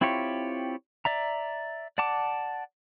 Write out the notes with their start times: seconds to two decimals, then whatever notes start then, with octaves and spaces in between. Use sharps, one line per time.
0.01 C4 E4 F4 G4 C#5
1.05 D5 E5 A#5
1.98 D5 F#5 A5 D6